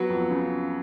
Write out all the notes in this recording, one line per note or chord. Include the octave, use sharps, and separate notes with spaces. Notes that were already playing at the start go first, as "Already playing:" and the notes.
Already playing: F#3 B3
F2
C#3